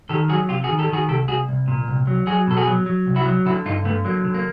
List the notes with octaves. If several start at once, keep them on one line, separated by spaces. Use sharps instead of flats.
D#3 G4 A4
F#3 F#4 G#4
C3 F4 G4
F#4 G#4
D#3
G4 A4
D#3 F#4 G#4
C2 G4 A4
C2 F#4 G#4
C2
A#2
C2
F#3
F#3 F#4 G#4
B2 A4
F#4 G#4
F#3
F#3
C2
E4 F#4
F#3
D3 E4 F#4
G2 D#4 F4
D3 A3 B3
F#3 A#3
D3
A#3